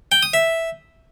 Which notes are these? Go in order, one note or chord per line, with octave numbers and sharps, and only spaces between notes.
G5
D#6
E5